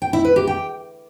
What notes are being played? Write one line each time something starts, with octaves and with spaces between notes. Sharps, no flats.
G5
E4
B4
G4
G5